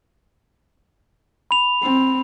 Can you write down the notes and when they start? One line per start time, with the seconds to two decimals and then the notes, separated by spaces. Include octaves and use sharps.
1.51 B5 F7
1.83 C4